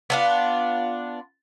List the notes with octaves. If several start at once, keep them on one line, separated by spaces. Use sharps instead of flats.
B3 D4 F4